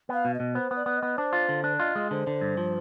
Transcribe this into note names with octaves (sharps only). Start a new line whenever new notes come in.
B3 F5
B2
D#5
B2
B3 C5
B3
D5
B3
D#5
B3
D4 C5
F4
D3
D4
F4 D#5
G#3
D3 C5
D3
G2
F3